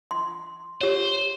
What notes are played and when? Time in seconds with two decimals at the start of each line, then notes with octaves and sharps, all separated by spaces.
0.11 C6
0.81 G4 C5 C#5